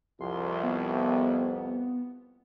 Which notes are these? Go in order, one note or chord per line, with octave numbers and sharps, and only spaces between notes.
C2 F2 C6
B3